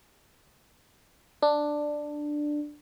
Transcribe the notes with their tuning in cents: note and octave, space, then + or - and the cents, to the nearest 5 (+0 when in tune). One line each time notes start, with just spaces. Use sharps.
D4 +10